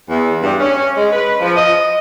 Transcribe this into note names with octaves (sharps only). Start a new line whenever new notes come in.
E2
G2
C#4
G#3
B4
F3
D#5